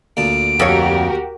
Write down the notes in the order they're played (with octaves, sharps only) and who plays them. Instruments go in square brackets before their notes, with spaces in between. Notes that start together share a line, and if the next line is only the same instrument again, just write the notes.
[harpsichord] D2 A#2 A5 [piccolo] D7
[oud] F2 C#5 [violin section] F#4 G4 A#4